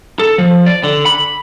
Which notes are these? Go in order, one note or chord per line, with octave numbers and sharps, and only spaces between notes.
A4
F3
D5
D3
B5